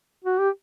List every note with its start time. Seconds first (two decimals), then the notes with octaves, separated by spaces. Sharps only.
0.24 F#4
0.39 G4